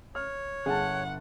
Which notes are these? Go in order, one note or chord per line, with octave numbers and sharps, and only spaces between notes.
C#5 F6
G1 G#4 F#5 A5